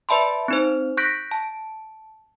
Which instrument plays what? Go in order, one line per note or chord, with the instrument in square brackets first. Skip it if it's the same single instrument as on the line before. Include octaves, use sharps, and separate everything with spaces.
[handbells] B4 D5 E5 A5 B5 C6
C4 D#4 C5
C#6 F#6 G6 A#6 B6 D7
A5